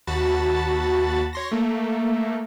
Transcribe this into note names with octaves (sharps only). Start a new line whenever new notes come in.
D#2 F#4 A5 B5 A6
C#5 C6 A#6
A3 A#3